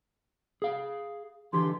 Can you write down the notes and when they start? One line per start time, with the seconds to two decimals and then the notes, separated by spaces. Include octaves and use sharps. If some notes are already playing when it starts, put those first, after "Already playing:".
0.62 G#4 F5
1.53 D3 E3 G4 C6